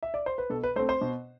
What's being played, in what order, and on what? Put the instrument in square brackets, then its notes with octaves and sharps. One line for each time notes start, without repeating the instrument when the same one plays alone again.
[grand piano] E5
D5
C5
B4
B2 A4
B4
A3 C5
C4
C5
B2